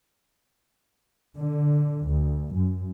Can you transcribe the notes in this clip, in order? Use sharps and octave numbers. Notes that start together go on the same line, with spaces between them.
D3
D2
F#2